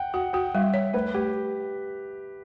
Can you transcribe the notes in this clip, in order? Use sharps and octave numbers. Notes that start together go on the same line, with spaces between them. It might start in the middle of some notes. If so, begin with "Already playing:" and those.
Already playing: F#5 G5
F#4 F#5
F#4 G5
G3 E5
C#5
A3 B4
A3 G4